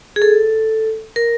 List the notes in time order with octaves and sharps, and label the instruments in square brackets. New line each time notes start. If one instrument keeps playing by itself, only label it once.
[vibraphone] G#4
A4
A#4